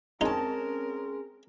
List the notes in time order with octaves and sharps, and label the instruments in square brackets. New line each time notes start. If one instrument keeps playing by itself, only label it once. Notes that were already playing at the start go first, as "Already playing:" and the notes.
[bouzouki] G#3 A5 [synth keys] C4 C#4 [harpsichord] D#4 [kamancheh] A#4